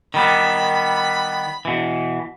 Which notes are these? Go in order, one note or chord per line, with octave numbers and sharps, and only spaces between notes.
D#3 G3 B3 B5
B2 E3